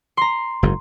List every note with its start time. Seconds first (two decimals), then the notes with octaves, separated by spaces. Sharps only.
0.17 A#5 C6
0.63 F#1 G#2